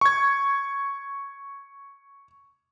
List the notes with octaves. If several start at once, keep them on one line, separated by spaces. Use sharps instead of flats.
C#6 G#6